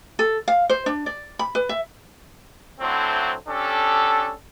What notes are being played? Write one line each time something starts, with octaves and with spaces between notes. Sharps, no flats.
A4
F5
C5
D4
D5
B5
B4
E5
D3 F#3 A3 C4 E4 C5
C#4 D4 G4 A4